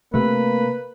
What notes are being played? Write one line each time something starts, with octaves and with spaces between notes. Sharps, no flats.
C3 A3 A#3 B4